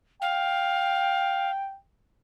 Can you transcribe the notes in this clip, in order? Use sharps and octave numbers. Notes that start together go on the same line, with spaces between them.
F5 G5